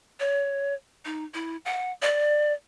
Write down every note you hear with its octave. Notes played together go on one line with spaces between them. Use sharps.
C#5
D#4
E4
F#5
D5